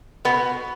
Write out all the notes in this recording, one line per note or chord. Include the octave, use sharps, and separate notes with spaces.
B2 B3